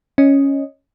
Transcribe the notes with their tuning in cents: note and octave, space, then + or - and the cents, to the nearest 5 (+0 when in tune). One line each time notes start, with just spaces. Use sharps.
C#4 -5 D#5 +0